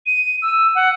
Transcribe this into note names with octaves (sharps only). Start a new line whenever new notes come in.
D#7
E6
F#5